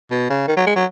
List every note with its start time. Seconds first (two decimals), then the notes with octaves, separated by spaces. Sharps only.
0.11 B2
0.30 C#3
0.48 D#3
0.57 F#3
0.67 G#3
0.76 F#3